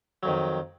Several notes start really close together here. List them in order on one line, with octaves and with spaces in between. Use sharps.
F#3 F2 D#3